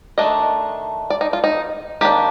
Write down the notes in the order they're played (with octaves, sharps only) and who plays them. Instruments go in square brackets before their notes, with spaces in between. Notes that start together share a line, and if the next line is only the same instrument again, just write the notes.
[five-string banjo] D#3 A3 D4 D#5
D5
D#4
F4
D#4
D#3 A#3 D4 G4